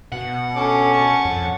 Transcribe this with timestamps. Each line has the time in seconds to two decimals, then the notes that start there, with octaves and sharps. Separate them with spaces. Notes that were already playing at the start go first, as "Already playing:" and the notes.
0.12 B2 F#5
0.56 C#4 A4 D6
0.93 A5 C#6
1.25 F2